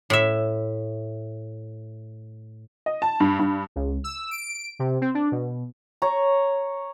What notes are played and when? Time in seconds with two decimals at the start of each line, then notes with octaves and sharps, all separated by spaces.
0.10 A2 E5
2.86 D#5
3.02 A5
3.20 G2
3.39 G2
3.76 C#2
4.04 E6
4.31 D7
4.79 C3
5.01 C4
5.14 D4
5.32 B2
6.02 C#5 A#5